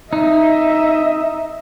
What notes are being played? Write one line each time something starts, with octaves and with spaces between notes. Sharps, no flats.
D#4 D#5 E5